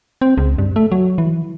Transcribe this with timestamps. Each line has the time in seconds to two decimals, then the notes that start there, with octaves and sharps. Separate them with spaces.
0.22 C4
0.38 C#2
0.58 G2
0.76 A3
0.92 F#3
1.18 E3